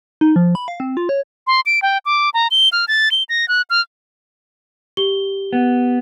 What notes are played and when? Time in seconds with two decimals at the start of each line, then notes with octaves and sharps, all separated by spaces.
0.21 D#4
0.36 F3
0.55 B5
0.68 F5
0.80 C4
0.97 F4
1.09 C#5
1.47 C6
1.66 D7
1.82 G5
2.06 D6
2.34 A#5
2.51 G7
2.72 F6
2.88 A6
3.12 G7
3.29 A#6
3.48 F#6
3.70 F6
4.97 G4 G7
5.53 B3